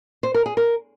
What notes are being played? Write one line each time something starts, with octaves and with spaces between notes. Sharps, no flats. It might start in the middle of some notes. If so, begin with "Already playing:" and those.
C5
A#4
G#4
A#4